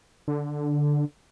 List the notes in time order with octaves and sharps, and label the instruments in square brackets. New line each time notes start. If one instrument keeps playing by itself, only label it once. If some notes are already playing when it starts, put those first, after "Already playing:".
[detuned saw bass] D3